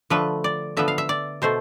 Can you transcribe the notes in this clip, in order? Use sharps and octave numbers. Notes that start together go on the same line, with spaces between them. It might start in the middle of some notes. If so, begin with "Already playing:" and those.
D3 F3 A3 B4
D5
D3 F3 B3 E5
F5
E5
D5
B2 A3 C5